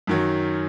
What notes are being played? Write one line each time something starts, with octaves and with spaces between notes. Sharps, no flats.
F#2 D#3 F#3